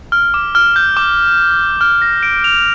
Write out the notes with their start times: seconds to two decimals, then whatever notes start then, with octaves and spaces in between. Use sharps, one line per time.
0.12 F6
0.34 D6
0.55 F6
0.76 G6
0.97 D6
1.81 F6
2.02 A#6
2.23 D7
2.44 F7